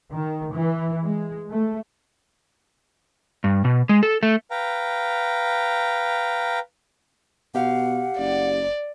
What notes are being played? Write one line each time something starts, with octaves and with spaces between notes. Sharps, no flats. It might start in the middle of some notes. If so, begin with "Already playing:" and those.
D#3
E3
G#3
A3
G2
B2
G#3
A4
A3
B4 F5 G5 A#5
B2 G4 F5 F#5
F#1 D5